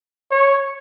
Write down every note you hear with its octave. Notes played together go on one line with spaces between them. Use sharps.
C#5